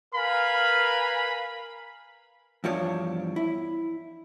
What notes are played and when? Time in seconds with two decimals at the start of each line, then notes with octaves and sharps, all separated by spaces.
0.14 A#4 B4 F5 G#5 B5
2.64 E2 G2 F3 D4 C#5
3.36 E4